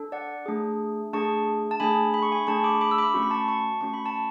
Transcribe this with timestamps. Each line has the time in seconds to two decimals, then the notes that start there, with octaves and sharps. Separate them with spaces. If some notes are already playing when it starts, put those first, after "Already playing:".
Already playing: D4 A4
0.12 D5 F#5
0.46 A3 D4 G#4
1.13 A3 D4 G#4 A5 C#6
1.71 A5
1.80 A3 D4 G#4 G#5 B5
2.14 B5
2.22 C#6
2.32 G#5 B5
2.47 A3 D4 G#4 A5 C#6
2.64 B5 D6
2.81 B5 D6
2.91 E6
2.98 B5 D6
3.14 A3 C#4 F#4 C#6
3.23 B5
3.31 A5 C#6
3.48 A5 C#6
3.81 A3 C#4 F#4 C#6
3.94 B5
4.06 A5 C#6